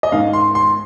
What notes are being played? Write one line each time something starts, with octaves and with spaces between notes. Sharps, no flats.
D#5
G#2 D#3 F5
C6
C6